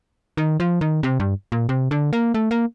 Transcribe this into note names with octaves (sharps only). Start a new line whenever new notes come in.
D#3
F3
D#3
C3
G2
A#2
C3
D3
A#3
A3
A#3